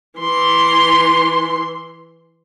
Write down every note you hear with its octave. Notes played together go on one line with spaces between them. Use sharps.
E3 C6